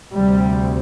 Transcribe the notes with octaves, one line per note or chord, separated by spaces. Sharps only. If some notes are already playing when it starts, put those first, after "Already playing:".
D2 C3 G3